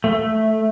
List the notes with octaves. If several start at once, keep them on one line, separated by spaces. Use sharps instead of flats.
A3